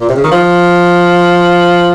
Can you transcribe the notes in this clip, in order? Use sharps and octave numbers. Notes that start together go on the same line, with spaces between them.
A#2
C3
C#3
D#3
F3